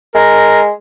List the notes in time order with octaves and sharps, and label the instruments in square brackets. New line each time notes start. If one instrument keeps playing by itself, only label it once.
[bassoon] G#3 [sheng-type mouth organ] A#4